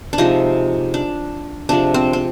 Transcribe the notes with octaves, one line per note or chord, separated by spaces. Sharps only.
D4
C3 F3 G#3 D#4
D4
C3 F3 G#3 D4
C4
C4